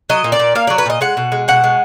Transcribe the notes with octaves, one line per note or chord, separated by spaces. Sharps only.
F#3 D#5
A#2
D5
A#2
A#3 F5
F#3 D5
B4
A#2 D#5
G#3 F#5
B2
G#3
B2 F#5
G#3